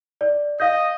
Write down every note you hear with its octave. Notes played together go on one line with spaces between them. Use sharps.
D5
D#5 F5 G6